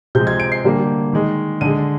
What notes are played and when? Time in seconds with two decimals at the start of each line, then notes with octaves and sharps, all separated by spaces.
0.15 C3 F3 G#3 G6
0.27 G#6
0.40 D7
0.52 C7
0.64 D3 G3 A#3
1.13 D#3 G#3
1.61 D3 G#3 D#7